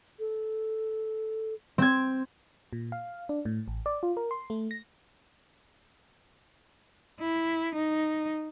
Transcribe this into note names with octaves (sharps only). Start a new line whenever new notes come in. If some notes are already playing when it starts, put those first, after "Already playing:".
A4
C4 G#6
A#2
F5
D4
A2
A1
D5
F4
A#4
C6
A3
A#6
E4
D#4